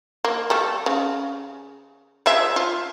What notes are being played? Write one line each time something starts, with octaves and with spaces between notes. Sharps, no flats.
A#3
G3 A3
C#3
F3 G#3 E5
F4